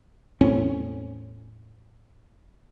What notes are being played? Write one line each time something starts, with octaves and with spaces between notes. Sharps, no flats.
E2 A2 C4 C#4